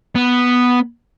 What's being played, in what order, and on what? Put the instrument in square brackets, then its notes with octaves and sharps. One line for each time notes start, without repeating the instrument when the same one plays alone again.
[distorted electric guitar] B3